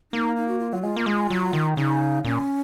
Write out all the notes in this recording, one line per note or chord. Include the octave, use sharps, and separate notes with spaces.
A#3 D#4
D#4
F#4
F4
F#3 F4
G#3 F4
A#3
G#3
F#3
D#3
C#3 D#4
A#2 C#4